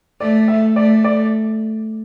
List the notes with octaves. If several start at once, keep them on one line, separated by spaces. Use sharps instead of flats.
A3 D5
E5
A3 D5
D5